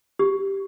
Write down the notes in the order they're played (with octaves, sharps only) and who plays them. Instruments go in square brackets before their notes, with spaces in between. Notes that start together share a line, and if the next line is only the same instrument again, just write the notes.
[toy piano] G4